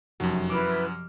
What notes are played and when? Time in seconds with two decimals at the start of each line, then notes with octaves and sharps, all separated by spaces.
0.20 F1 F#2 F#3
0.50 E4 B4 D6 E6 F6